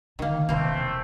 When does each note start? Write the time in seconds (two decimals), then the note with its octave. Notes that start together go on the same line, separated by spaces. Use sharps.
0.19 D3 D#3 A#3
0.49 E1 C3 E3 A3 A#3 C4